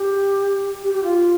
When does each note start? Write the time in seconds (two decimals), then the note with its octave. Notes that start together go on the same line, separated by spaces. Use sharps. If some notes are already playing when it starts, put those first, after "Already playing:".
Already playing: G4
0.83 G4
0.94 G4
1.03 F4